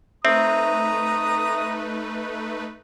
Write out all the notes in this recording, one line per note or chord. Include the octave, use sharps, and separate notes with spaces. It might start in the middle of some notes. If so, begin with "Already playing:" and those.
A3 C4 D#4 B4 E5 A#5 D#6